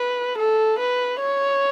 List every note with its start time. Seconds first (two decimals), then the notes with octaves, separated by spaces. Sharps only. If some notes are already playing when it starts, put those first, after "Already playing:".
Already playing: B4
0.38 A4
0.79 B4
1.20 C#5